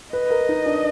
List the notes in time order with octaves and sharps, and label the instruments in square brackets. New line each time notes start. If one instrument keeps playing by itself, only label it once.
[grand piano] B4 [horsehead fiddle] D#5
[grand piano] A#4
D#4
D4